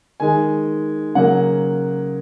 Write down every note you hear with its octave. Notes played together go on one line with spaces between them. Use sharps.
D#3 G#3 G#5
C#3 F#3 A#3 F#5